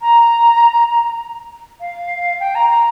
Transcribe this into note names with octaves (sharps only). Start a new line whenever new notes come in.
A#5
F5
G5
A#5
A#5